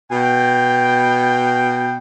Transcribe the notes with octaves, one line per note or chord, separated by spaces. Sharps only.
B2 G5